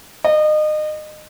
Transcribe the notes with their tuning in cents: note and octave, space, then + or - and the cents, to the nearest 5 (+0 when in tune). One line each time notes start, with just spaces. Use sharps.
D#5 -30